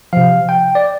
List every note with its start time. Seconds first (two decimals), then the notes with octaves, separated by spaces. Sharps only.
0.13 C3 F3 F5
0.49 G5
0.75 D5